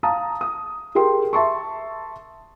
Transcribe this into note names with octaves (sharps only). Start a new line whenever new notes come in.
F5 A5 A#5 D#6
D#6
G4 G#4 A#4 G5 C6
E5 A5 C6 C#6